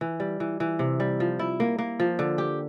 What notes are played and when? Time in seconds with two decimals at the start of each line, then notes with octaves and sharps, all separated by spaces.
0.01 E3
0.20 G3
0.40 E3
0.60 E3
0.79 C3
1.00 G3
1.20 F3
1.39 E4
1.60 A#3
1.79 A#3
2.00 F3
2.19 D3
2.38 G4